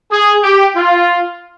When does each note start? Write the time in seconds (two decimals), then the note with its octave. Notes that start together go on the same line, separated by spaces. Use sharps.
0.11 G#4
0.44 G4
0.76 F4